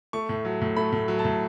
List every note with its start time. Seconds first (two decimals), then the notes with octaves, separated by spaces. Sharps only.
0.13 A3 C#6
0.29 A2
0.45 F#3
0.61 A2
0.76 A3 B5
0.92 A2
1.08 F#3
1.19 A5
1.25 A2